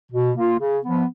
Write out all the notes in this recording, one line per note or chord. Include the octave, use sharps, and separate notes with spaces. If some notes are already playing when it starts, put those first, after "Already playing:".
B2
A#3 F4
C#3
F3 B3